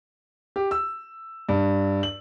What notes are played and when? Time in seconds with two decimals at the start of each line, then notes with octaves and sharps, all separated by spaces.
0.56 G4
0.71 E6
1.49 G2
2.03 F#7